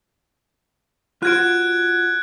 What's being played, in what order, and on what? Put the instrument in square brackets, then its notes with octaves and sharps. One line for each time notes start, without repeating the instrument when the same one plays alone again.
[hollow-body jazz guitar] F4 F#4 C5 [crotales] F#6 G#6 D7